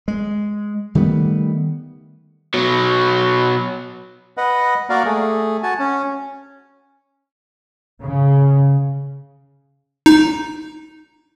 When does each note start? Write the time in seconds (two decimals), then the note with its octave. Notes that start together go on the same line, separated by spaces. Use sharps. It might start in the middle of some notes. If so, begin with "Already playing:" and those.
0.08 G#3
0.95 D#3 G3 A3 B3
2.54 B2 F#3
4.37 B4 D#5 F#5
4.90 A#3 F#4 A#4 D5 F5
5.05 A3 G#4
5.63 F#4 G#5 A5
5.79 C#4
8.03 C#3
10.06 D#4